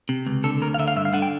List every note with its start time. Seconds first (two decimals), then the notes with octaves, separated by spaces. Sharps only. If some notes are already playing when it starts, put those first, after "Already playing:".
0.09 C3
0.27 C#2
0.44 D3 A4
0.61 D2 A#4
0.74 F5
0.79 D3 E5
0.88 F5
0.96 G2 E5
1.05 F5
1.13 D3 F#5
1.22 G5